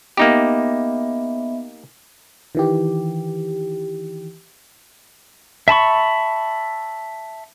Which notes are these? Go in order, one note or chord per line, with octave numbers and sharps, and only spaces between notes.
A#3 B3 D#4 G4 D#5 E5
D#3 E3 G4
E5 A5 B5 C#6